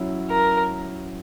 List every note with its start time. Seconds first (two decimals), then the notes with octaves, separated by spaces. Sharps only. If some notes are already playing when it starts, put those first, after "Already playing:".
Already playing: F#3 C#4 E4
0.30 A#4